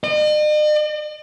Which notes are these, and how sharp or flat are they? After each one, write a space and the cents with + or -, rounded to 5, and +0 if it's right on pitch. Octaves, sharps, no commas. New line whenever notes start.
D#5 -45